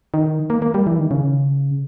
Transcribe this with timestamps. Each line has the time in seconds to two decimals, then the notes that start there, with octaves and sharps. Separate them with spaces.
0.14 D#3
0.50 A#3
0.62 A#3
0.74 G3
0.87 E3
0.98 D#3
1.11 C#3